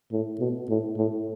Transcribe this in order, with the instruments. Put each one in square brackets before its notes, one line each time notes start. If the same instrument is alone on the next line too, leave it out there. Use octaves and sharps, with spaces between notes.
[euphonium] A2
B2
A2
A2